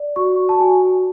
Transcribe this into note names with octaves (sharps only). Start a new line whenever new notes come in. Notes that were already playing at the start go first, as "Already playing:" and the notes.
Already playing: D5
F#4 C#6
A5
F#4 G#5